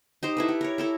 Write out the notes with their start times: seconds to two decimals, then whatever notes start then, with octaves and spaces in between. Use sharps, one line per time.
0.23 D#4 G4 C5
0.37 E4 A4 B4
0.48 G4
0.61 A#4 C#5
0.78 E4 A4 A#4